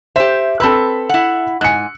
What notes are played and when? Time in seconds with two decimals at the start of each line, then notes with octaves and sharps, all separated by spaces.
0.16 G4 C5 E5
0.60 C4 A4 B4 B5 E6
1.09 E4 F#5
1.61 G#2 G#5 F#6 C#7